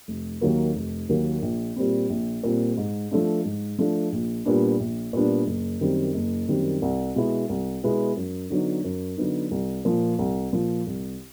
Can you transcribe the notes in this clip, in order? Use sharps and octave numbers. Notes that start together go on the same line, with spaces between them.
F1
D#2 D#3 F#3 A#3
F1
D#2 D#3 F#3 A#3
A#1
A#2 G3 C4
A#1
A#2 G3 C4
G#2
F3 A3 D4
G#2
F3 A3 D4
A#1
A#2 G3 B3 D4
A#1
A#2 G3 B3 D4
F#1
F#2 D#3 G3 C4
F#1
F#2 D#3 G3 C4
C2
B2 G#3 B3 E4
C2
B2 G#3 B3 E4
F#2
D3 F#3 B3 D#4
F#2
D3 F#3 B3 D#4
C2
A#2 F3
C2
A#2 F3
C2